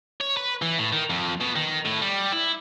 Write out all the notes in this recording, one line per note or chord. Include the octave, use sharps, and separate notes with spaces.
C#5
B4
E3
A2
D#3
F2
B2
D#3
A2
G3
E4